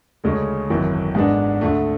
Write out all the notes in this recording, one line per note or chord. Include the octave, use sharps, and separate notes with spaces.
D2 C#3 G#3 C#4
G#1 F#2 E3
G#2 G#3 B3 D4
D2 D3 A3